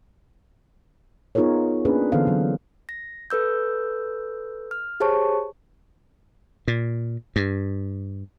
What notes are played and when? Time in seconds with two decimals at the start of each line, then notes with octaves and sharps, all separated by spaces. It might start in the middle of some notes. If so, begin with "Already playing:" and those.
1.35 B3 D#4 F4 G#4 A#4 C#5
1.85 A#3 C#4 D4 G#4 B4
2.12 D3 E3 B3 A4 C5 F5
2.27 D3 F#3
2.89 A#6
3.30 A4 B4 E6 G6
4.71 F6
5.00 G4 G#4 C5 C#5 A5 C#6
6.68 A#2
7.36 G2